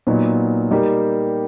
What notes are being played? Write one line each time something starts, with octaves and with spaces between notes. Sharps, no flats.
A#2 F#3 B3 D#4
G3 A#3 D#4 G4